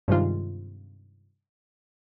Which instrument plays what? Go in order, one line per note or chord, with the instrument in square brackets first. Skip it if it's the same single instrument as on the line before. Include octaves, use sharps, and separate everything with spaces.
[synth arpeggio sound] G2 C3 D#3 G#3 F4